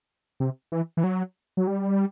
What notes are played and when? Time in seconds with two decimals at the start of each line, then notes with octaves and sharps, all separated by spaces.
0.40 C3
0.72 E3
0.97 E3
1.04 F#3
1.57 F#3
1.67 G3